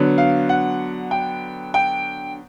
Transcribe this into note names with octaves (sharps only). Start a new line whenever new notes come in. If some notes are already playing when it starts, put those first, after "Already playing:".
Already playing: D3 F#3 B3
F5
F#5
G5
G5